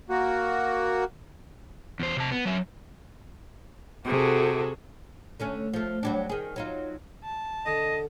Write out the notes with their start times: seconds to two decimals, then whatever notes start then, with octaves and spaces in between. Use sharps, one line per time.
0.09 A#3 F#4
2.00 E2 C5
2.16 C3 A5
2.32 B3
2.45 F#3 E5
4.05 C3 F#4 G#4 A4
5.40 D3 A3 C#4
5.73 F3 A3
6.03 F#3 G3 D4
6.29 D#3 G#4
6.56 F#3 D#4 F4
7.24 A5
7.66 D3 D#5